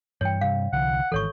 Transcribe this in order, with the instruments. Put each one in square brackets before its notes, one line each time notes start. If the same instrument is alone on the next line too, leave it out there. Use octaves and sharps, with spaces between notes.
[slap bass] G2 E3 [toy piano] C#5 G5
[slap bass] G2 C3 [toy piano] F5
[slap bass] C2 D3 E3 [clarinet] F#5
[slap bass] G#1 E3 [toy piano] A4 C#5 C#6